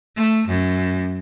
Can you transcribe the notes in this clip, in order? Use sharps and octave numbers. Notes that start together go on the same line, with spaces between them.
A3
F#2